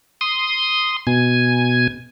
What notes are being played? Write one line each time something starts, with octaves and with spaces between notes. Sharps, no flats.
C6 D#6
B2 G#5